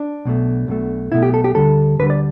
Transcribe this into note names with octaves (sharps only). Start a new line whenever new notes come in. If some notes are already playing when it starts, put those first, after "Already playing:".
Already playing: D4
B1 B2 A3
B1 B2 A3
B1 B2 A3 E4
G4
A4
G4
D2 D3 G3 A4
D2 D3 G3 B4
D5